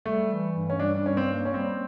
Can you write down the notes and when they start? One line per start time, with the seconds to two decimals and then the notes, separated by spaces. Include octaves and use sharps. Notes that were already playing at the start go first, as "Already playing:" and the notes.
0.06 G3 A3
0.30 E3
0.55 G2
0.70 C#4
0.80 G3 D4
1.04 G2 C#4
1.17 C4
1.29 A#3
1.45 C#4
1.53 G3 C4